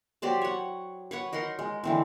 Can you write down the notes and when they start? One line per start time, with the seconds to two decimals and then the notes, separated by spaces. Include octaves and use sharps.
0.22 F#3 G4 C5 D5
0.42 C#5 F#5
1.11 B4 C#5 F#5
1.33 D#4 A#4 F#5 C6
1.59 G#3
1.84 D3 E3 C4